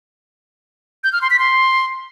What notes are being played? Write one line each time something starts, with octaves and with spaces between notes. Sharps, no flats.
G6
F6
C6
B6
C6